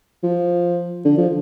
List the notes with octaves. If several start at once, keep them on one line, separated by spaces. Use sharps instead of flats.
F3
D3
F3